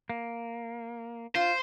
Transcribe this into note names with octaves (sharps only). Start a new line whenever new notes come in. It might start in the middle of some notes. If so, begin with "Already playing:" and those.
A#3
F4 C5